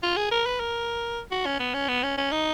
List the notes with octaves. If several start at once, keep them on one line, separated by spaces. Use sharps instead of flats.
F4
G#4
A#4
B4
A#4
F#4
C#4
B3
C#4
B3
C#4
C#4
D#4